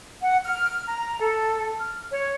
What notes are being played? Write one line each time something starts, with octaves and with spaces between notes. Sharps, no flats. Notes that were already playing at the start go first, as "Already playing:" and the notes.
F#5
F6
A#5
A4
F6
C#5